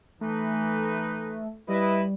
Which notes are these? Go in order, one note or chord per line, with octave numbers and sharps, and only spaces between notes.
E3 A3 D#4 B4
G3 E4 B4 D#5